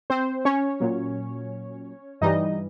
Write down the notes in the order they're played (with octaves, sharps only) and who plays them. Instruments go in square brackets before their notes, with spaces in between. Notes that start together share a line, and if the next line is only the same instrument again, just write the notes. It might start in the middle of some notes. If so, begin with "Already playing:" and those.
[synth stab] C4 C5
C#4 C#5
A#2 F#3
G2 E3 G3 D#4 D#5